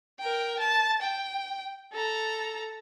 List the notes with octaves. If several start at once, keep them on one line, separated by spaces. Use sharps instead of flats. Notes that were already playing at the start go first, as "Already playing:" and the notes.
A#4 G5
A5
G5
A4 A#5